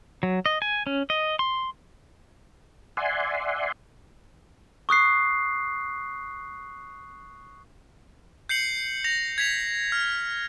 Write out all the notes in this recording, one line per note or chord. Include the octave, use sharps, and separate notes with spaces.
F#3
D#5
G#5
C#4
D#5
C6
D5 E5 F#5 G#5 C6
C#6 D#6 F#6 C7
G6 C7 C#7 F#7
A#6 F7
G#6 B6 F7
F6